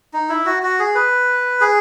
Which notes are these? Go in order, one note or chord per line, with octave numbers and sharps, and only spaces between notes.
D#4
E4
F#4
F#4
G#4
B4
G#4